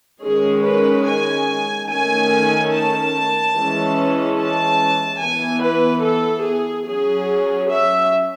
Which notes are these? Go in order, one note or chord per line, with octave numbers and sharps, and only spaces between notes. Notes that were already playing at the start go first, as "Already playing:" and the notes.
D#3 G#3 C#4 G#4
B4
G#5
D#3 A3 C#4 G#5
A5
E3 G#3 C#4
A5
E3 B3 G#5
B4
A4
G#4
F#3 C#4 G#4
E5